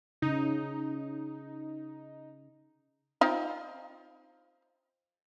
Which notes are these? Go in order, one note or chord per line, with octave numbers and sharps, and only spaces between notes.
C#3 D#4
C4 D#4 F4